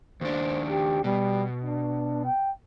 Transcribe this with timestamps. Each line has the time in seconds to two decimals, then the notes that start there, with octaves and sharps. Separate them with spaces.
0.21 D#2 D4 C5
0.69 G4
1.04 B2 G3
1.65 D4
2.25 G5